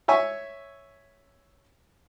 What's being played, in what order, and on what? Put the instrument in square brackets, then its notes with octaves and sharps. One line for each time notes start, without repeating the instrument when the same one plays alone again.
[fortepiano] C#5 E5 G#5 C#6